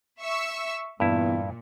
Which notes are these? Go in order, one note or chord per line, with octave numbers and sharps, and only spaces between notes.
E5 C#6 E6
E2 G2 A#2 E4